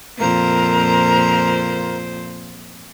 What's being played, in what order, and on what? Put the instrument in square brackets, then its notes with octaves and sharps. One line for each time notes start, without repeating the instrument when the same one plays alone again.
[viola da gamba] F2 A#2 C5 [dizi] A#4